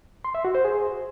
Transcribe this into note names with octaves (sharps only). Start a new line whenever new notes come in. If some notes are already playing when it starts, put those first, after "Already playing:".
C6
E5
F#4
C5
G#4